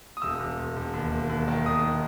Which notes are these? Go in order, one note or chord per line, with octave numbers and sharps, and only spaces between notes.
D#6
E1 E6
E1
E1
E1
D#2
E1
D#2
D#3
E1 D#6
D#3